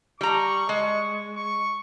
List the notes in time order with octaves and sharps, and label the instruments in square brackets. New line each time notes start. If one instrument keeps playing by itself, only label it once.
[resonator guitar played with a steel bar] G3 A#5 [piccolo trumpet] C#6
[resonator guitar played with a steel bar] G#3
[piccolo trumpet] C#6